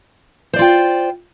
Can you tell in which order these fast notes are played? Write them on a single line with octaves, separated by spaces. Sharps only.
C5 D5 F4 G5